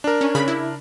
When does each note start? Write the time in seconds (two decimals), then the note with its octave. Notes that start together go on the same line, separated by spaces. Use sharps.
0.04 D4 A#4
0.21 C#4
0.35 C#3 B5
0.48 E4